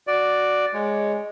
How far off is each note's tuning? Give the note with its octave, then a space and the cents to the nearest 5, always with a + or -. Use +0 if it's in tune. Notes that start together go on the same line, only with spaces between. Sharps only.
F#4 -5 D5 +0
G#3 +0 C#5 +0